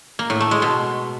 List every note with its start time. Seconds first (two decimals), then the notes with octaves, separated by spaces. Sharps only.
0.19 A#3
0.30 A2
0.41 A3
0.51 G#3
0.62 B2